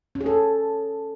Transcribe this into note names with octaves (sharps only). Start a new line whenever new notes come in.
C#4
G#4
A4